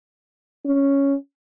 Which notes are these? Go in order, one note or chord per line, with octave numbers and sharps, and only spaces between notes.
C#4